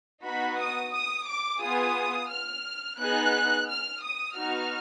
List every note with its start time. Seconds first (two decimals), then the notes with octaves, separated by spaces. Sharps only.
0.24 B3 D#4 F#4 B5
0.58 D#6
0.93 D#6
1.28 D6
1.62 B3 F4 G#4 D#6
2.31 F6
3.00 B3 D#4 G#4 F#6
3.69 F6
4.04 D#6
4.38 B3 D#4 F#4 F6